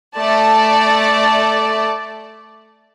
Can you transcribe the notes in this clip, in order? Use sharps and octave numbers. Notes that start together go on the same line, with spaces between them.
A3 D5 A5